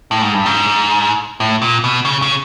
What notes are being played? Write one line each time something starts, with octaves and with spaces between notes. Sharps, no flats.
A2
G#2
G2
G#2
A2
A#2
B2
C#3
C#3